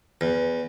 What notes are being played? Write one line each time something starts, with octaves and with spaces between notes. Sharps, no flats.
E2